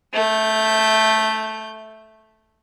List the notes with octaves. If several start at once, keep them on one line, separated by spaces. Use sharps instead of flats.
A3 G6